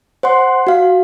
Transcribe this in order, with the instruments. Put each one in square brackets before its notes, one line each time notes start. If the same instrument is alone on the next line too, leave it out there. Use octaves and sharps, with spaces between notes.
[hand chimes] C5 F#5 C6
F#4 F5